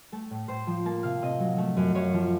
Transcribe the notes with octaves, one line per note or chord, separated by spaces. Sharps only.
A3 A5
A2
A2 C5
F3
A#3 A5
C3 F5
C3 D#5
F#3
A3
F#2
F#2 C#5
F3